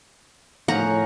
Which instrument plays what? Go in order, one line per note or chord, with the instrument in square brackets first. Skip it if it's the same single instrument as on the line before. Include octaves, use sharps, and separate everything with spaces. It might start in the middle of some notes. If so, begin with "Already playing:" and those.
[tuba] A2 [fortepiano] D#3 F3 [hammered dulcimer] C#4 [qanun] F#5 A#5